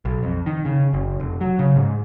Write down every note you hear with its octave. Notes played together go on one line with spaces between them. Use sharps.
B1
F2
D#3
C#3
F#1
F1
F#3
C#3
G#2